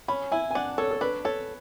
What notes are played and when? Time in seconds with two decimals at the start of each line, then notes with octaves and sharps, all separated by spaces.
0.08 C#4 B5
0.32 E4 G#5
0.51 G#5
0.55 D4 F#5
0.78 A4 C#5
0.91 A4
1.01 D4 B4
1.25 A4 C#5